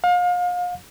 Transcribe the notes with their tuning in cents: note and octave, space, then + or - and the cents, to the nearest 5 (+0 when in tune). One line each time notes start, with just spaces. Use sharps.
F5 +35